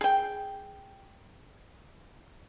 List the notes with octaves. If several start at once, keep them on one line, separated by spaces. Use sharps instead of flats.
G#4 G5